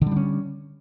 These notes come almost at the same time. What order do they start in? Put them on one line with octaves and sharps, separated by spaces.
D3 G3 D4 C#4